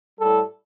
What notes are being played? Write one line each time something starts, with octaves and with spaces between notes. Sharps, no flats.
A2 G3 A4